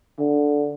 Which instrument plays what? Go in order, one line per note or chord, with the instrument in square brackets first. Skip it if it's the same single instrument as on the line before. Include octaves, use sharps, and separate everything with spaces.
[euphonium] D3